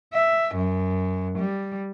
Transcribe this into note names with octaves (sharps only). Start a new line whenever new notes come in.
E5
F#2
G3